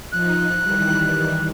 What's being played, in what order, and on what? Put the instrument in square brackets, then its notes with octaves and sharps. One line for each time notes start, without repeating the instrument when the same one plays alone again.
[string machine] F3 D#4 [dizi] F#6
[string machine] D#3 E3 G3